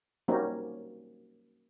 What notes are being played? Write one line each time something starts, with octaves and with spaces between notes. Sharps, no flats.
F#3 G3 A#3 C4 C#4 D#4